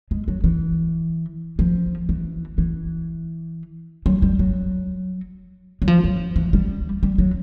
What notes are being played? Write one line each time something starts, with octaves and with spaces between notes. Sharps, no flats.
G#3
F#3
E3
F3
E3
E3
F#3
G3
F#3
F#3
F3
F#3
E3
G3
G3
F#3